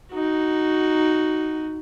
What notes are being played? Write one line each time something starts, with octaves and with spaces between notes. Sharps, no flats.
D#4 F#4